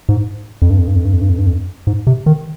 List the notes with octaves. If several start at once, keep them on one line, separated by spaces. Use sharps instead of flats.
G#2
F2
G2
F2
G2
F2
G2
F2
G2
F2
G2
F2
G#2
C3
D#3